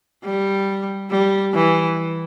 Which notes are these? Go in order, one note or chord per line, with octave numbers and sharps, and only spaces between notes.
G3
G3
E3